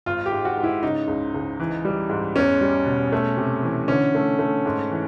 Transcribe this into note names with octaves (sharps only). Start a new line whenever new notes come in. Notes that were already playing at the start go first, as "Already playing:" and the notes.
G#1 F4
G4
G#2
F#4
G#2
E4
C#3 D#4
C#2
C#2
E3
G3
G#2
E2 C#4
G3
B2
A3
C3
E3
D3 C#4
A3
A3
G#2
E3